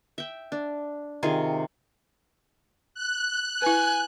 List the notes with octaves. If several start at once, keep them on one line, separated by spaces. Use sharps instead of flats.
E5 G5
D4
C3 D#3 F4 G#4
F#6
E4 B4 G#5